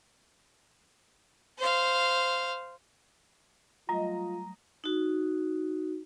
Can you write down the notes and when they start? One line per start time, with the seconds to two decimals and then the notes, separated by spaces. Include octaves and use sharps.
1.59 C5 F5
3.89 F#3 G3 A3 F4 D#5 A#5
4.84 D#4 F#4